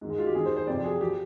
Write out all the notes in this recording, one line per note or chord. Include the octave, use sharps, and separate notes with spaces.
G#2 D#3
G#3
F4
G4
G#2 D#3 G#4
C5
C5
F2 C3 F3 D5
G#4
F3 G4